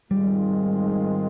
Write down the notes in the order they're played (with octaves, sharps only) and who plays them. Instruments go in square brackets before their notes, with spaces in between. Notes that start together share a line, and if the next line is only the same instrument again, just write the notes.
[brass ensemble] G#2 D#3 G#3 C4 F4 [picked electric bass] G3